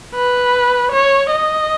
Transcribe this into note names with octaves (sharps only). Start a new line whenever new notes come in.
B4
C#5
D#5